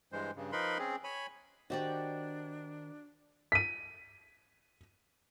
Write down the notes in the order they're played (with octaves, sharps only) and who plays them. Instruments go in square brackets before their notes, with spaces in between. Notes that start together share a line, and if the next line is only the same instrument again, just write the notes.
[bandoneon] G2 E3 G#3 C5
G2 C#3
F3 D#4 A#4 B4 B5 C6
C4 C#4 G#4
C#5 G#5 B5
[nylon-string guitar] D#3 C5 D#5 [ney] D4 [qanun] F#4 G4 D5
[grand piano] B6 D#7